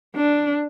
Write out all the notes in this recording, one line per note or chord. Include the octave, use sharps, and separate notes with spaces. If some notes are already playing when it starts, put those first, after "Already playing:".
D4